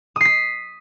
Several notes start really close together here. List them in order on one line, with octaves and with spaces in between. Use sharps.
D#6 C7 B6